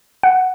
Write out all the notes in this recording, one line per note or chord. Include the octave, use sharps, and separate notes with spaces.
F#5